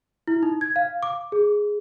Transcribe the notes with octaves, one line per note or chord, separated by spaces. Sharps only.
E4
D#4
G#6
F5
D6
G#4